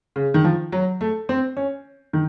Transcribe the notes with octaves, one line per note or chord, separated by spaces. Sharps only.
C#3
D#3
F3
F#3
A3
C4
C#4
D#3